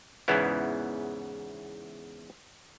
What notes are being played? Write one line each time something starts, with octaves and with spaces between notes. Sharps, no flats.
E2 G#2 C#3 E3 B3 E4